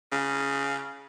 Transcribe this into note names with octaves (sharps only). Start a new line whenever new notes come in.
C#3